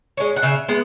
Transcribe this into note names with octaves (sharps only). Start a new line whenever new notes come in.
G#3 C#4
F#5
C#3 E5
G#3 B3